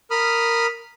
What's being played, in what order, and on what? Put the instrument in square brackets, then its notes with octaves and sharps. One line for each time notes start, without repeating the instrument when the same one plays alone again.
[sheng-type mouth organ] A#4 B5 D#6 F6